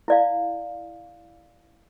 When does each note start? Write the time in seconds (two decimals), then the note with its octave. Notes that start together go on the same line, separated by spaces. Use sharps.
0.08 E4 D5 F5